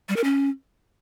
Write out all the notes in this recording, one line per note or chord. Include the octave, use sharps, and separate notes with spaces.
G3
A#4
C#4